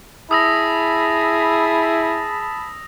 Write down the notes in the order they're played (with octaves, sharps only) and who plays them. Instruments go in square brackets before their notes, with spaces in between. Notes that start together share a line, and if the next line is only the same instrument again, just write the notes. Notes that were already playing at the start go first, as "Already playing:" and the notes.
[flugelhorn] E4 [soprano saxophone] G#4 [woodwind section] A5 B5 [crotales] D#6 E6 A#6